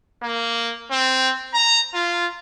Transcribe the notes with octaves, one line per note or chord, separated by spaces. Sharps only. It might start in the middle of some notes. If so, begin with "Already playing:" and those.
A#3
C4
A#5
F4